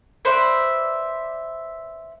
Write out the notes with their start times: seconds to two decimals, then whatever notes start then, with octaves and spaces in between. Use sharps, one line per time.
0.25 B4 C5 D5 E5